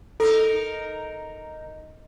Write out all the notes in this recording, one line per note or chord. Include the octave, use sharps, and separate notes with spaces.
D#4 A4 A#4